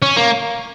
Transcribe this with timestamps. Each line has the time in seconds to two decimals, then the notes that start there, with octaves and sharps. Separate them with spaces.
0.02 C#4
0.17 A#3